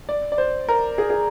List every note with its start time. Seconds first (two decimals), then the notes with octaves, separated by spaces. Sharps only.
0.09 D5
0.32 D5
0.38 C5
0.69 A#4
0.98 G#4
1.10 G#4